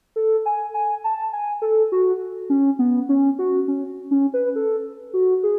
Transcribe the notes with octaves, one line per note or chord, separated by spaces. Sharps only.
A4
G#5
G#5
A5
G#5
A4
F#4
C#4
B3
C#4
F#4
C#4
C#4
B4
A4
F#4
G#4